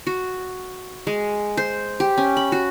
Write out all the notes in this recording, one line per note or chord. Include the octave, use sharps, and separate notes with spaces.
F#4
G#3
C5
G4
C#4
B5
F#4